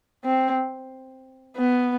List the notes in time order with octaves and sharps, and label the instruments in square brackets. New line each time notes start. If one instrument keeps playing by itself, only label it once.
[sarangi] C4
B3